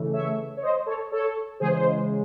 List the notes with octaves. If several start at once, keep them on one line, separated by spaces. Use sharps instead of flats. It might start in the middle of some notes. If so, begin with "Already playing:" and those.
Already playing: C#3 E3 A3
C#5 E5
C#5
C5 D#5
A4 C#5
A4 C#5
C#3 E3 G#3 G#4 C5
C5